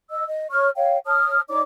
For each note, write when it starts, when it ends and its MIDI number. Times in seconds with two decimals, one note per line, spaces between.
0.10 0.24 75
0.10 0.24 88
0.27 0.47 75
0.50 0.70 73
0.50 0.70 85
0.50 0.70 89
0.75 0.98 73
0.75 0.98 77
0.75 0.98 79
1.06 1.41 73
1.06 1.41 81
1.06 1.41 87
1.06 1.41 89
1.49 1.60 63
1.49 1.60 73
1.49 1.60 74
1.49 1.60 86